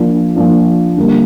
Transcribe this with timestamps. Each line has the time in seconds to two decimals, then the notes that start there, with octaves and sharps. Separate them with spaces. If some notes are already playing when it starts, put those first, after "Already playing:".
Already playing: F3 A#3 D4 F4
0.35 F3 A#3 D4 F4
0.97 D3 G3 A#3